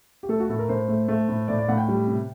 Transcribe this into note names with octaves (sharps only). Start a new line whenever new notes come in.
G4
A3 A4
F#4
A2 A4
A#4
A2 C5
A3
A3
A2
A2 D5
D5
A2 F#5
G5
G3
C3